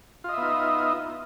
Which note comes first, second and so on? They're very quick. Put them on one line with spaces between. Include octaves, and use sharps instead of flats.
F4 D#5 E5 B3 D#4